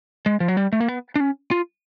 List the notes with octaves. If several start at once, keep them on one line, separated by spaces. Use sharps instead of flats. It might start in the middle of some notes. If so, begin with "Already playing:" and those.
G#3
F3
F#3
G3
A3
A#3
B3
D4
C#4
F4